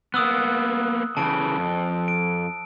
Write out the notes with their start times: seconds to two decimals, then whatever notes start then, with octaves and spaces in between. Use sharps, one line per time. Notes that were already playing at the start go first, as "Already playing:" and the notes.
0.14 A#3 B3 D#6 E6 F#6
1.17 C#3 E3 A5 D7
1.57 F2
2.08 D7